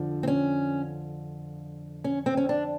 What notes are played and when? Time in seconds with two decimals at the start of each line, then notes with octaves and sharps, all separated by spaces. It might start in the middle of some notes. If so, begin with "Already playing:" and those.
Already playing: F2 D3 F3
0.23 C4
0.27 C#4
2.04 C#4
2.26 C4
2.37 C#4
2.49 D4